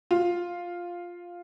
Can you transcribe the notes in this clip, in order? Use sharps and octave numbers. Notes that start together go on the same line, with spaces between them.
F4